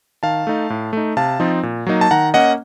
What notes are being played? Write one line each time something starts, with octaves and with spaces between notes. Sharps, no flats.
D#3 F5 A5
A3 D#4
A2
A3 D#4
C3 F5 A5
F3 C4 D#4
A#2
F#3 A#3 D#4
A5
D#3 F#5 A#5
A#3 C#4 D#5 F#5